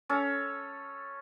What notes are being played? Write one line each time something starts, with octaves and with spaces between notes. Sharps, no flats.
C#4 A4